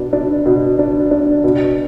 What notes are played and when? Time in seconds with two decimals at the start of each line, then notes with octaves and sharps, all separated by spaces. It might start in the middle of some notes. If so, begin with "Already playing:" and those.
Already playing: B2 D4
0.13 D4
0.46 B2
0.79 D4
1.11 D4
1.44 B2